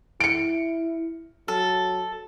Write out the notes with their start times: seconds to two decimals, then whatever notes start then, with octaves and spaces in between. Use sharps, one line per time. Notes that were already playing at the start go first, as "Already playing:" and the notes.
0.20 E4 C#7 D7
1.48 F#3 A4